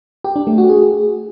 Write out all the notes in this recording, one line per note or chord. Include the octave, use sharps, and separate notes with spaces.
G4
D4
A3
F#4
G#4